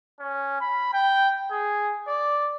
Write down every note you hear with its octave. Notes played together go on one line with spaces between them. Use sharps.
C#4
B5
G5
G#4
D5